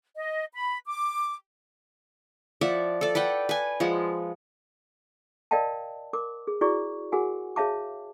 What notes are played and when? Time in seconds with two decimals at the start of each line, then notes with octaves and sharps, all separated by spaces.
0.16 D#5
0.54 B5
0.87 D6
2.61 F3 D5 E5 F#5
3.01 A4 D5
3.15 B4 D5 F#5 G5
3.49 B4 G#5
3.80 F3 G#3 F#5
5.51 A#4 D5 D#5 F5 G5 A5
6.13 A#4 D6
6.47 G#4
6.61 E4 F#4 G#4 D5 C#6
7.12 F#4 G#4 A#4 F#5 G#5
7.56 G#4 C#5 E5 F5 A5 D6